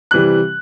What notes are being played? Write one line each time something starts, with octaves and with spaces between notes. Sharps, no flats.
C3 E3 G3 F#6